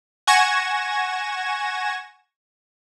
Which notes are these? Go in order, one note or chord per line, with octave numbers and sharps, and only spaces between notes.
F#5 G#5 C#6 G#6 A#6 E7